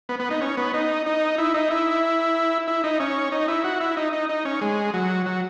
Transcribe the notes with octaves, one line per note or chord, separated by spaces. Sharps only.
B3
B3
D#4
C#4
B3
D#4
D#4
E4
D#4
E4
E4
D#4
C#4
D#4
E4
F#4
E4
D#4
D#4
D#4
C#4
G#3
F#3
F#3